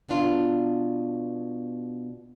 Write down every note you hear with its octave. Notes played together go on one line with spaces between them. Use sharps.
B2 B3 D4 F4